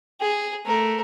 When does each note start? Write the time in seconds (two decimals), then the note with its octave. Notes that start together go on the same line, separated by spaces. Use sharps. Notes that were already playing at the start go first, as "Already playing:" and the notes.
0.21 G#4
0.65 A3 A#4